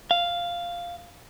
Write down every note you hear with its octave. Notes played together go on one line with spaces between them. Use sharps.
F5